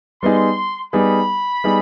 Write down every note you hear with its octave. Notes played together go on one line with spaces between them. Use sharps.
G3 B3 D#4 G#4 C6
G3 B3 D#4 G#4 B5
G3 B3 D#4 G#4